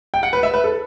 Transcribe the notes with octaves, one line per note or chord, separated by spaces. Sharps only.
G5
F#5
B4
E5
B4
A4